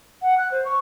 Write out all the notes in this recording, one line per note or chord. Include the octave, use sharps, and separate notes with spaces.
F#5
F#6
C5
C#6